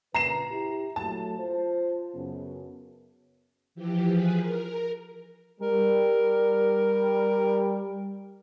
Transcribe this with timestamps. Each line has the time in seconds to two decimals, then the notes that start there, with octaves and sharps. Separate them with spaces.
0.15 A#2 C#3 B4 A#5 C7 E7
0.51 E4 G4
0.96 F#3 A3 A5
1.39 F4 C5
2.15 F#2 C#3 B3
3.75 E3 F3 G4
4.09 F3 G#4 B4
4.39 A#4
5.61 G3 A#4